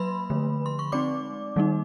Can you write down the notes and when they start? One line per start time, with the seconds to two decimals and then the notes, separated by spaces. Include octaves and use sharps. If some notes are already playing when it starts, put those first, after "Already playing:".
Already playing: F#3 A#3 B4 B5 C6
0.30 D3 F3 A3
0.66 C6
0.79 C#6
0.92 G#3 C4 D#4 D5 D6
1.56 D#3 G3 A#3 D#4